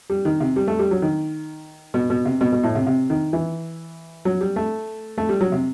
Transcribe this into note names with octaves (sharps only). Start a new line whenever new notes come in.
G3
D#3
C3
G3
A3
G3
F#3
D#3
B2
B2
C3
B2
B2
A2
C3
C3
D#3
E3
F#3
G3
A3
A3
G3
F#3
C3